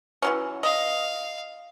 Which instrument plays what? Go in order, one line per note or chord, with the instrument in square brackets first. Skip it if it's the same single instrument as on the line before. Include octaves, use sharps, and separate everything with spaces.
[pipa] E3 F#3 C#4
[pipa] D#5 [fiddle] F5